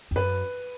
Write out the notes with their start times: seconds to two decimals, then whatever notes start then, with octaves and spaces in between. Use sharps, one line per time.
0.11 E2
0.16 F#2 B4